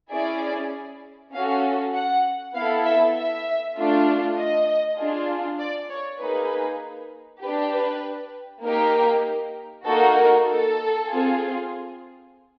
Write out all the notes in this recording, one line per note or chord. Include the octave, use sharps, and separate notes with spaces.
C#4 E4 G#4 D5
C#4 F#4 A4 F5
F#5
B3 E4 A4 F5
E5
E5
A3 D4 F4
D#5
D4 F4 G#4
D5
C#5
A#3 D#4 G#4 B4
D4 G4 B4
B4
A#3 D#4 G4 A#4
A#3 D#4 F#4 A4
A#4
A4
C4 F4 G#4